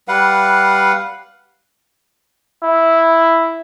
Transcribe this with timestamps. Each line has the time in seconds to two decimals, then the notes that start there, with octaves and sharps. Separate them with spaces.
0.08 G3 B4 F5 F#5
2.63 E4